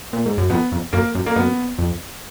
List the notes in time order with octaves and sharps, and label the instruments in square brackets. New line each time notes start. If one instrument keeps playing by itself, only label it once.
[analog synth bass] A#2
G#2
F#2
[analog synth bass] F2 [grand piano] B3
[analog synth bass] F2
[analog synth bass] F#2 [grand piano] A#3
[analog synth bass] F#2
[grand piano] A#3
[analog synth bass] F#2 [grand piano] B3
[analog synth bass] F2